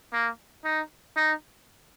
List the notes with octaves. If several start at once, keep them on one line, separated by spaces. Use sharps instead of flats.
A#3
D#4
D#4